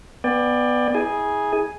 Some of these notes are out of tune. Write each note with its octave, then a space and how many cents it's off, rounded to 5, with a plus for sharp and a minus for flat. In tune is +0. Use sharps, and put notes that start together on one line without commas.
B3 +0 D5 +15 G5 +35
E4 -35 G#4 +0 G#5 +0